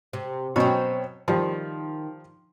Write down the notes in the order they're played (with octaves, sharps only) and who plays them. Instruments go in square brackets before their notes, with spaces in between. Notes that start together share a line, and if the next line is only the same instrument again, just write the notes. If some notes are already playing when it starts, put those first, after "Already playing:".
[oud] C3
[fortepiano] B2 F#3 C#4 [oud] C4 C#5
[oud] D#3 [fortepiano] F3 G3